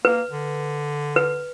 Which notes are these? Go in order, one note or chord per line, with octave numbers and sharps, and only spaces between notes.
A#3 B4
D3
B4